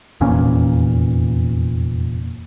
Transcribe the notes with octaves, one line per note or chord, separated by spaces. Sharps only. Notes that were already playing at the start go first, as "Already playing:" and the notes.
F1 E2 A#2 C#4